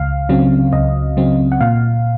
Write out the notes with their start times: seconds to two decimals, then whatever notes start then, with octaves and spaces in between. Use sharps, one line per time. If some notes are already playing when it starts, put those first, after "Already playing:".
Already playing: C#2 F5
0.29 C#3 F#3 C4
0.73 C#2 D#5
1.17 C#3 F#3 C4
1.52 F#5
1.60 A#2 F5